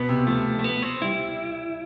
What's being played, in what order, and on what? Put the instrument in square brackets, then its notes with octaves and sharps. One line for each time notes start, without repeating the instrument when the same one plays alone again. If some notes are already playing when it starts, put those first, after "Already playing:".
Already playing: [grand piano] B2 [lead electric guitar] B3
[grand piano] C3
[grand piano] F3 [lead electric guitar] A3
[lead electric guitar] A3
B3
C4
[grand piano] G3 [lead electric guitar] E4